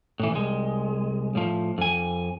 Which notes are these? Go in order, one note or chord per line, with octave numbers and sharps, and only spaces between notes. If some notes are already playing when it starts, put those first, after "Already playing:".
A2 E3
C2 G#3
A2 F3
F2 G#5